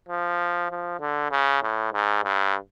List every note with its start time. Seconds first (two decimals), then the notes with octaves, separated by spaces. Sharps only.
0.09 F3
0.71 F3
1.00 D3
1.31 C#3
1.62 A2
1.93 G#2
2.24 G2